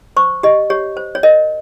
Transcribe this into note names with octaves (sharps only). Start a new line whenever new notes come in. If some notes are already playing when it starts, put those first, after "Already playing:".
C5 C#6
G4 D#5
G4 C#5
C5
C#5
A#4 D#5